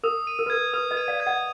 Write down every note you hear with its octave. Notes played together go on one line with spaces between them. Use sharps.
A#4 D#6
D#7
A#4
B4
A#4 G#6
B4 D#6
B4 D#5
D#7
D5 F5
G#6
D#5 F#5